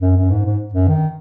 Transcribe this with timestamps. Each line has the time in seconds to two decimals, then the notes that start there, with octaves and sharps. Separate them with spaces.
0.02 F#2
0.16 F#2
0.31 G#2
0.45 G#2
0.73 F#2
0.88 D#3